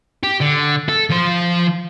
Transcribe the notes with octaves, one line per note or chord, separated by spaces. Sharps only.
G4
D3
A4
F3 C5